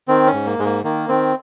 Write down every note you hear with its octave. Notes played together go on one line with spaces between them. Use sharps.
D#3 C4
C#4
G#2
A#3
G#2 G#3
A#3
D#3 A#3
D#3 C4